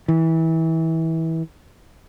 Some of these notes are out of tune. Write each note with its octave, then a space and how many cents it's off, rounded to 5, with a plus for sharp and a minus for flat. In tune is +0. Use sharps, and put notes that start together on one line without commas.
E3 -25